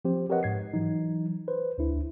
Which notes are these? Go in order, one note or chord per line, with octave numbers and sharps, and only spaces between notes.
F3 C4 G4 C5
G4 A#4 B4 C#5 D#5 F#5
G#2 G#6 C7
E3 F#3 D#4
B4 C5
D2 D4 E4